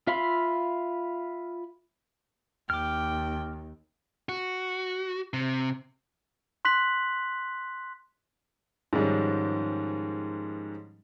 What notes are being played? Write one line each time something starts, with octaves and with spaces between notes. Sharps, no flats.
F4 E5 F5 B5 C6
D#2 G5 D6 F6
F#4
C3
C6 F#6 B6 F#7
G#2 D#3 F3 G3 G#3 C#4